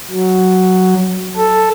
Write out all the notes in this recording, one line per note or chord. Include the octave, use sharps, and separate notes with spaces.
F#3
A4